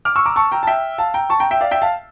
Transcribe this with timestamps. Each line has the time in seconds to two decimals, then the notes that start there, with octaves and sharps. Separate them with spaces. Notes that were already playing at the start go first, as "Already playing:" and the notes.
0.05 D6 F6
0.16 C#6 E6
0.26 A#5 D6
0.36 A5 C#6
0.52 G5 A#5
0.63 A5
0.67 E5 G5
0.98 F5 A5
1.14 G5 A#5
1.30 A5 C#6
1.40 G5 A#5
1.51 E5 G5
1.61 D5 F5
1.71 E5 G5
1.82 F5 A5